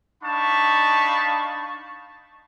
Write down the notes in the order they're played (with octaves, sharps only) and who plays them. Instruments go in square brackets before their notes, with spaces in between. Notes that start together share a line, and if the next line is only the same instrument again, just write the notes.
[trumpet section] D4 D#4 F5 A5 B5 C#6